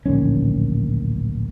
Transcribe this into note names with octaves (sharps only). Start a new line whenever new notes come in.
D1 A#1 D#3 C#4